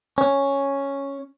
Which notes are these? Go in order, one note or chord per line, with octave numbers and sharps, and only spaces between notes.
C#4